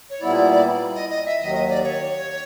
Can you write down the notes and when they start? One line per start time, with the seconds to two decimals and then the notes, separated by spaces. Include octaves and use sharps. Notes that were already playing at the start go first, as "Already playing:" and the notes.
0.10 C#5
0.21 A#2 G3 B3 E4 D5
0.95 D#5
1.10 D#5
1.26 E5
1.39 D#2 D#3 F#3 D#5
1.54 D#5
1.69 D5
1.84 C#5